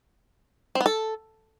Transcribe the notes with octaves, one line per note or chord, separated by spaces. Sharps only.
C4
B3
A4